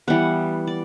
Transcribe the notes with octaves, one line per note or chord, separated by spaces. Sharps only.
E3 G3 B3 F#5
D5